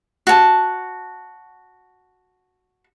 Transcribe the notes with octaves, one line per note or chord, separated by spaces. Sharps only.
F#4 A5